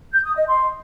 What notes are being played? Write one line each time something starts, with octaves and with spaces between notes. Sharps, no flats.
G6
D#6
D#5
C6